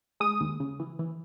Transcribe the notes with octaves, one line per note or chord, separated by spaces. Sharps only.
G#3 D#6
D#2
C#3
E3
E3